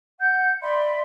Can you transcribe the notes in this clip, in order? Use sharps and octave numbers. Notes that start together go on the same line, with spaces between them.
F#5 G6
D5 E5 B5 C6